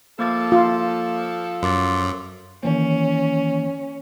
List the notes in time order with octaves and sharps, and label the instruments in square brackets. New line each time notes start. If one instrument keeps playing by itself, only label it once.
[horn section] F3 A4 [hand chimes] A#3 D6 A6
[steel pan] F4
[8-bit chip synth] F#2 [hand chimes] C6 D6 A6
[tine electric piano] D#3 E3 A#3 [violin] C#4